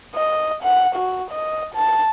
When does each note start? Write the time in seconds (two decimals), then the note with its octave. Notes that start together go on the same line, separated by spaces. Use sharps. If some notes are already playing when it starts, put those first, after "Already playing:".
0.15 D#5
0.63 F#5
0.95 F#4
1.31 D#5
1.74 A5